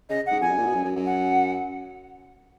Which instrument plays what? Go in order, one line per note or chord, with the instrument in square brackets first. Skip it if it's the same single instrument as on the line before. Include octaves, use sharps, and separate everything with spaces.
[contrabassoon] C#3 [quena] D#5
[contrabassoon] G#2 [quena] F#5
[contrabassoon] F2 [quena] G#5
[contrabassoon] F#2
A#2
B2
F#2
F#2
F#2
[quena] F#5